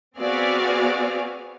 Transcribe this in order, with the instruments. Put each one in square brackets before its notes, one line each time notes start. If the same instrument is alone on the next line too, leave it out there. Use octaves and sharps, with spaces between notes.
[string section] B3 C4 F#4 G#4 D5 F5